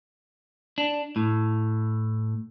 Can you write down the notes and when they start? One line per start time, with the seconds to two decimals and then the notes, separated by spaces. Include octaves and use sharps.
0.78 D4
1.16 A2